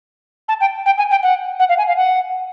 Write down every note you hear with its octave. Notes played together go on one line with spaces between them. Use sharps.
A5
G5
G5
G#5
G5
F#5
F#5
F5
G#5
F5
F#5